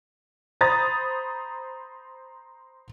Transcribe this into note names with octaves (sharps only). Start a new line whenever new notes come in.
C5 A#5 B5 D#6 A6